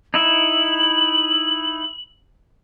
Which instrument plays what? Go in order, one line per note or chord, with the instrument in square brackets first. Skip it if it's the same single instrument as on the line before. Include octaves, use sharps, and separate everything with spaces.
[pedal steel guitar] D#4 E4 E5 [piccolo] F#7